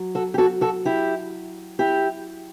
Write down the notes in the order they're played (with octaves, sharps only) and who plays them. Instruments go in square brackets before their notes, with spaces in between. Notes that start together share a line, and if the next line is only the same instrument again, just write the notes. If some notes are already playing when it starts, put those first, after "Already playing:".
Already playing: [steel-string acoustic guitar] F#3
F#4 A4
G4
F#4 A4
F#4 A4
E4 G4
E4 G4